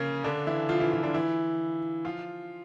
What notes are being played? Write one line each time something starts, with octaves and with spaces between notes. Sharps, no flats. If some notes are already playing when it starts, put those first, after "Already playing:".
Already playing: C#3 A#3 C#4
D3 D4
E3 E4
F3 F4
E3 E4
F3 F4
D3 D4
E3 E4
F3 F4